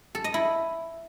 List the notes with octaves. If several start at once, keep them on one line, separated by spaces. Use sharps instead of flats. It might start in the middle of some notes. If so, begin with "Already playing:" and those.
A4
D#5
E4